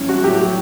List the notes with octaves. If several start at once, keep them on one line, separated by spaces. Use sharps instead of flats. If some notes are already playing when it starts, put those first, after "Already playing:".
Already playing: A2 E3 G3 C#4
F#4
A2 F#3 G4